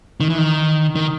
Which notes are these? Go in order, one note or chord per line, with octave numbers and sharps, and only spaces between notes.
D#3
E3
D#3
D#3